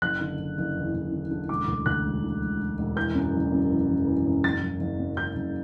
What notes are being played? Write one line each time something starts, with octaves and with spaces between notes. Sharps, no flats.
F#1 F#6
D3
F#1
F#1
E2
F#1
D3
D3
E1 D6
D2
D2 F#6
E1
D3
E1
E1
E1
E3 G6
F#2
F#1
F#2
E3
F#1
E3
F#2
F#1 A6
F#1
F#1
F#2
F#1 G6
F#1